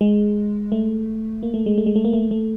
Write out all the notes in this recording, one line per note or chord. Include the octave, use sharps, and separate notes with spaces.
G#3
A3
A#3
A3
G#3
A3
G#3
A3
A#3
A3
A3